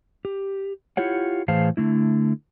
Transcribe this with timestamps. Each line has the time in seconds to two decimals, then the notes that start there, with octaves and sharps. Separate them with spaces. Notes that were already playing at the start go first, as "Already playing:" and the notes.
0.25 G4
0.97 E4 F4 G4 C#5 F#5
1.48 A2 E3 G#4 C5 F5 A5
1.77 D3 A3 E4